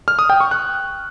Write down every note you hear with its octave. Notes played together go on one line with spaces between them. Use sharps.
F6
D#6
G5
C#6
F#6